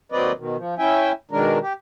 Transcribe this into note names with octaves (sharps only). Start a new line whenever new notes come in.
D#2 F#3 C4 B4 D5 D#5
B2 D#3
F3
C#4 E4 E5 G5 G#5
B2 D#3 G#3 D4 A#4
G4